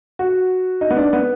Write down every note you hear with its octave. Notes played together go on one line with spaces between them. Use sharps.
F#4
D#4
B3
D4
B3